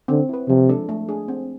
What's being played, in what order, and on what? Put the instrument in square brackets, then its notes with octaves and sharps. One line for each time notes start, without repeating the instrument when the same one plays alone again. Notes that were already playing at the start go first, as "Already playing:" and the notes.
[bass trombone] D3 [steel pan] C4
[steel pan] E4 B4
[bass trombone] C3 [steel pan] F3
[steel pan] G#3 D4 A4
A3
D4 G#4
C4